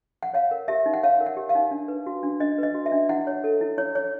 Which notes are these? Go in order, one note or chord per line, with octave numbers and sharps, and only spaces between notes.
F#5
C#5 F5
A#4
G4 E5
D#4
F#5
C#5 F5
A#4
F#5
G4
F5
D#4
D4
B4
F#4
D4
D4 D#5
B4 D#5
F#4
E5
D4
E4 F#5
C#5
A4
E4
E4 C#5
C#5